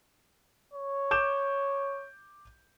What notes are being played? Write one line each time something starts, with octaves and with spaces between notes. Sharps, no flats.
C#5
D6 G6 E7